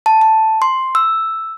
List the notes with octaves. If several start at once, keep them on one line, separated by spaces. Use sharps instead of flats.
A5
A5
C6
E6